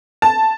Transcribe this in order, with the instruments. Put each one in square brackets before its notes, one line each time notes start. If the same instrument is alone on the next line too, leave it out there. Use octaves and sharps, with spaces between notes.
[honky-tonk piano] A5